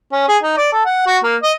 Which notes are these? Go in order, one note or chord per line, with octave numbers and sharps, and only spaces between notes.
C#4
G#4
D#4
D5
A4
F#5
F#4
A#3
D#5